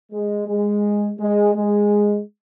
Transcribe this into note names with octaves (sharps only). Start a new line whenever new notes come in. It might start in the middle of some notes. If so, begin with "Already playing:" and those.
G#3
G#3
G#3
G#3